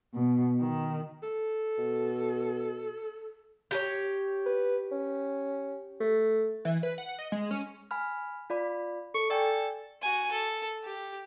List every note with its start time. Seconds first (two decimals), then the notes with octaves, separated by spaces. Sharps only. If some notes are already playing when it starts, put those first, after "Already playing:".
0.14 B2
0.59 D#3
1.23 A4
1.79 B2
3.71 G4 G#4 C#5
4.46 B4
4.91 C#4
6.00 A3
6.65 E3
6.83 B4
6.98 F#5
7.19 D#5
7.32 G#3
7.51 C#4
7.91 G#5 B5 F6
8.50 F4 D5 B5
9.14 A4 C#6
9.30 A4 D5 G5 G#5
10.02 F#4 G#5
10.31 A4
10.84 G4